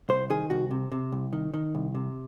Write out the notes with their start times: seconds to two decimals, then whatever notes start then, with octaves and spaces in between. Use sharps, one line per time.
0.09 C2 C5
0.30 D#3 G#4
0.50 C2 F#4
0.71 C3
0.92 C3
1.12 C2
1.33 D#3
1.54 D#3
1.75 C2
1.95 C3